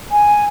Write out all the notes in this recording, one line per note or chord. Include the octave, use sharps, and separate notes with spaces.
G#5